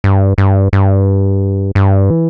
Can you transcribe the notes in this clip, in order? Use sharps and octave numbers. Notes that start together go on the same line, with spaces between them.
G2
G2
G2
G2
E3